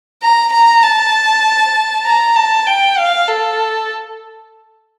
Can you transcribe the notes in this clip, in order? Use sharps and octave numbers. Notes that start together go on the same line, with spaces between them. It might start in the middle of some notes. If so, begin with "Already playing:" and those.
A#5
A#5
A5
A#5
A5
G5
F5
A4